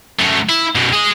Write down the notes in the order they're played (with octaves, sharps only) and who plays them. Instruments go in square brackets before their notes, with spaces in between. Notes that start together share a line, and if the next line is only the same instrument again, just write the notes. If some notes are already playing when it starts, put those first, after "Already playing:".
[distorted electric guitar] F#2 A3
E4
F#2 B2
G#4 D#5